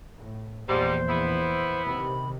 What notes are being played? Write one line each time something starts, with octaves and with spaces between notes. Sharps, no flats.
A2
A#1 E2 G#2 G3 C5
B3 E4
C3 D#3 B5